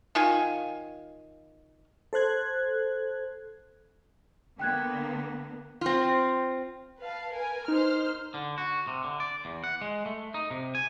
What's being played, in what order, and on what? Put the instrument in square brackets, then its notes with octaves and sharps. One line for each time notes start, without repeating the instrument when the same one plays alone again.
[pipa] D#3 F4 F5 G#5
[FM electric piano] A4 C5 F#6 G#6
[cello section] D3 A#3 B3 [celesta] G5 F#6 G#6
[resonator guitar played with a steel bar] C4 F4
[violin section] B4 F5 A5
A#4 B4 G#5
[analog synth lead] D#4 [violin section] C5 F6
[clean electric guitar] D3
F#4
C3
D3
D5
E2
F#5
G#3
A3
D#4
C3
G#5